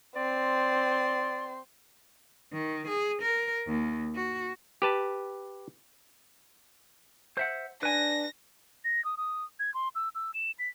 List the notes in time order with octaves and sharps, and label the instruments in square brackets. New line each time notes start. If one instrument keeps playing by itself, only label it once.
[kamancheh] C4 C6 [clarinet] D5
[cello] D#3
G#4
A#4
D#2
F#4
[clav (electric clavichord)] G4 B4 A5
[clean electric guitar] C5 E5 F#5
[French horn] D4 [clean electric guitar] B4 G#5 [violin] A#6
[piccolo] A#6
D#6
D#6
G#6
C6
E6
E6
E7
B6